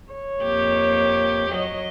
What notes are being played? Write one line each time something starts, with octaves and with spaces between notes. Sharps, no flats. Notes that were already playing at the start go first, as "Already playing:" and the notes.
C#5
F2 A#3 G4
F#3 D#5